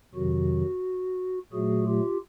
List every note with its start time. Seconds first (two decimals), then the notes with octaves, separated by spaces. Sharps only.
0.15 F2 C3 D#3 F#3 F#4
1.52 A#2 F#3 A3 F#4 G#4
1.87 F4 G4